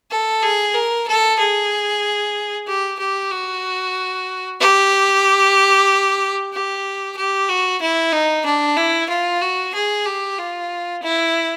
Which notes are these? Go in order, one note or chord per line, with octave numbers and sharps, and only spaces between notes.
A4
G#4
A#4
A4
G#4
G4
G4
F#4
G4
G4
G4
F#4
E4
D#4
D4
E4
F4
F#4
G#4
G4
F4
E4